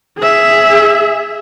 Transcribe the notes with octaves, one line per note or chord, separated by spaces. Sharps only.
G#4 E5